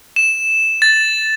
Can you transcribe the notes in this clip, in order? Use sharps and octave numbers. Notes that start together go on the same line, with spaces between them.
E7
A6